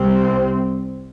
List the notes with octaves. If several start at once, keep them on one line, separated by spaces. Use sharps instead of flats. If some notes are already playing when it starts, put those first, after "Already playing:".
Already playing: C2 C3 G3 C4